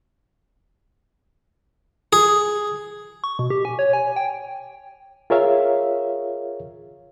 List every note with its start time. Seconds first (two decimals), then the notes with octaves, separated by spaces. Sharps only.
2.13 G#4
3.24 C#6
3.39 B2
3.50 G4
3.65 G#5
3.79 C#5
3.93 G#5
4.16 G5
5.30 F4 G#4 A#4 C#5 E5 F5